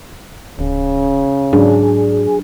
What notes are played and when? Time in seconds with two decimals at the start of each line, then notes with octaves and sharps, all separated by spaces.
0.59 D1 C#3
1.53 G#2 F#3 D4 G#4